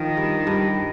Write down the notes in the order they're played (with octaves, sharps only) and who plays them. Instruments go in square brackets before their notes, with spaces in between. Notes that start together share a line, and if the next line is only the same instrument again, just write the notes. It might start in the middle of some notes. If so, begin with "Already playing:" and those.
Already playing: [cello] D#3 [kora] F3
[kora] G2
G2